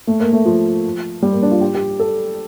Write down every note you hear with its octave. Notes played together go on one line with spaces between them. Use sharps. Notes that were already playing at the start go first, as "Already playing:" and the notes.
A3
A#3
A3
F3
G3
A#3
D4
F4
G4
G4
A4